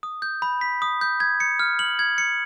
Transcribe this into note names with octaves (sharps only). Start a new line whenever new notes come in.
D#6
G6
B5
B6
D#6
G6
G#6
C#7
F6
F#7
G#6
C#7